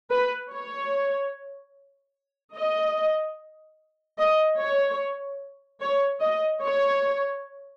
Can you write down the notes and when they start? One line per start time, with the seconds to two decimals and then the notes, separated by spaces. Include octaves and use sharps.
0.12 B4
0.53 C#5
2.56 D#5
4.19 D#5
4.60 C#5
5.81 C#5
6.22 D#5
6.63 C#5